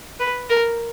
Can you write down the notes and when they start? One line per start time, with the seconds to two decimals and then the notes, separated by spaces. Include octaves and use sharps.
0.20 B4
0.50 A#4